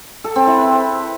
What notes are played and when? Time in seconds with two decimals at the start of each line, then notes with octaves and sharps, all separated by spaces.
0.24 A4
0.36 C4
0.47 E4
0.58 B4